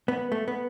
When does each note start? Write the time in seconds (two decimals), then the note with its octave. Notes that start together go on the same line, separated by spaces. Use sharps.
0.08 B3
0.32 A3
0.48 B3